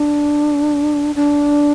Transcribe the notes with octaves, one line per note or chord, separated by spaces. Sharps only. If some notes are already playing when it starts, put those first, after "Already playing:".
Already playing: D4
D4